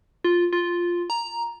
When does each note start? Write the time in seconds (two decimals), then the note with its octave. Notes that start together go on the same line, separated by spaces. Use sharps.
0.24 F4
0.53 F4
1.10 A#5